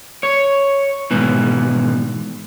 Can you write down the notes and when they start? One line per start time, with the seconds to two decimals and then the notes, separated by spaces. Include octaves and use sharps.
0.23 C#5
1.11 G#2 B2 D#3 E3